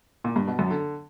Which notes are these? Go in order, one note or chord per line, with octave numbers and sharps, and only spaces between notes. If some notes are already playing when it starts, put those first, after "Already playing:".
A#2
G2
B2
F#2
D3